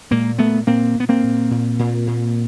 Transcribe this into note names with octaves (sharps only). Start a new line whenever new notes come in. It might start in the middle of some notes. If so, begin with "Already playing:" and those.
A#2 G#3 A#3
A#2 A3 B3
A#2 A#3 C4
A#2 B3
A#3 C4
A#2
A#2
A#2
A#2